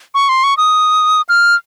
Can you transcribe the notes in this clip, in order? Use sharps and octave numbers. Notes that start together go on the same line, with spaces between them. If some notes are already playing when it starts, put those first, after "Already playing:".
C#6
C6
C#6
D#6
F6